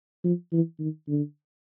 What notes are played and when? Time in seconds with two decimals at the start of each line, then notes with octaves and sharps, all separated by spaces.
0.24 F3
0.53 E3
0.80 D#3
1.08 D3